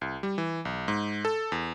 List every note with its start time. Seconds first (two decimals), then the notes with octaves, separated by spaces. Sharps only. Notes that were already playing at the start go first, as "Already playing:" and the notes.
0.01 C2
0.23 G3
0.38 E3
0.65 B1
0.88 G#2
1.25 A4
1.52 E2